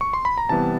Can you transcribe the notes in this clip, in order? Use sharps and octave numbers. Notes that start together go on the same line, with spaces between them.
C#6
C6
B5
A#5
C3 E3 G3 B3 A5